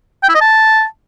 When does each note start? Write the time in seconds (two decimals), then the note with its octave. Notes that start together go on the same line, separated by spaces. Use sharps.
0.23 G5
0.29 E4
0.35 D#5
0.41 A5